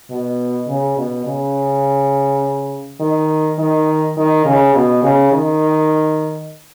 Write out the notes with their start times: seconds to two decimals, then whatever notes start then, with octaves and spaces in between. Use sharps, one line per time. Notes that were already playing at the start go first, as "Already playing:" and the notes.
0.11 B2
0.68 C#3
0.97 B2
1.26 C#3
3.00 D#3
3.58 D#3
4.17 D#3
4.45 C#3
4.74 B2
5.03 C#3
5.32 D#3